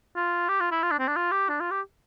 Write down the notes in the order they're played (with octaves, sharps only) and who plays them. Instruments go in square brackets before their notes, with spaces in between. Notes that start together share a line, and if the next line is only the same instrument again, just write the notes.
[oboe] F4
G4
F4
E4
F4
D4
C4
D4
F4
G4
D4
F4
G4